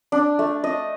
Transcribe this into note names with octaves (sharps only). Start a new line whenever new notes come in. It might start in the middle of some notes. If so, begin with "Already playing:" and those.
D4
A3
D#5